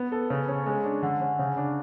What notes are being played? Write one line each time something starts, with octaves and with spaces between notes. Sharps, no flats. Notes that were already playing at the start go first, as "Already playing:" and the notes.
Already playing: B3
A4
C#3
C#4
G#3
D4
D3
C#4
C#3
D4